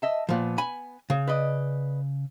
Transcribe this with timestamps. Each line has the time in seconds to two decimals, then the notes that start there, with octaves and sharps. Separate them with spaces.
0.02 D#5 E5 A5
0.29 A#2 F3 B3 B4
0.58 G#5 B5
1.10 C#3
1.27 B4 D5 D#5